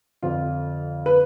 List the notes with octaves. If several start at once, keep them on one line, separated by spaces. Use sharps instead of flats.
F2 D3 F3 F4
B4